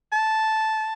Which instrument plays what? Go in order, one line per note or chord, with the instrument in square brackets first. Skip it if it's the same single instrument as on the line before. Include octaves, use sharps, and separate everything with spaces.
[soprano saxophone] A5